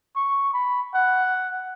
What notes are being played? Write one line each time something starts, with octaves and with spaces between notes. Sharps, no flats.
C#6
B5
F#5